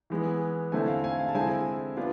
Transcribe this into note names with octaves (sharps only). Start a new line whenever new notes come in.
E3 G#3 B3
D3 A3 C4 E4 G#5
F5
G#5
F5
A5
D3 G#3 C4 E4 G#5
B3 D4 F4